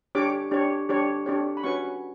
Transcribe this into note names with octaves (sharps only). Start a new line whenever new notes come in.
D4 G4 C#5 D6
D4 G4 C#5
D4 G4 C#5
D4 G4 C#5
B5
C#4 F#4 B4 C#6